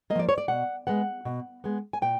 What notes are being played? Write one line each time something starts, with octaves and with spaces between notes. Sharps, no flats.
A#3 D#5
F3 D5
C#5
D5
B2 F#5
G#3 B3 F#5
B2
G#3 B3
G#5
A#2 G5